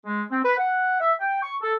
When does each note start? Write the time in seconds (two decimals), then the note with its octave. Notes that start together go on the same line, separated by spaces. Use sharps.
0.05 G#3
0.31 C4
0.45 B4
0.58 F#5
1.00 E5
1.20 G5
1.43 C#6
1.62 A4